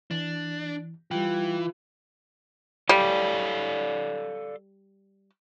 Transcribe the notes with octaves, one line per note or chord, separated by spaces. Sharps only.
E3 D4
E3 G3 F4 G5
G3 A4 D5 F5